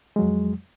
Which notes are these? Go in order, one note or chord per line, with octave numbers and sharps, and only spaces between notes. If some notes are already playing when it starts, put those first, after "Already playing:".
F2 F#3 G#3